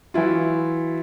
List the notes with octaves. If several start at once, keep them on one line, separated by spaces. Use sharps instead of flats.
E3 F#3 E4 F4